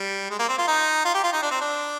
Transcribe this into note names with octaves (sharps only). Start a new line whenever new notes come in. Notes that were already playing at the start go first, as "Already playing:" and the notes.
Already playing: G3
G#3
A#3
C4
F4
D#4
F4
G4
F4
D#4
D4
C4
D4